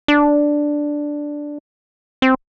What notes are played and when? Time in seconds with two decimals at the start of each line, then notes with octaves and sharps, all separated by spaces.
0.08 D4
2.22 C4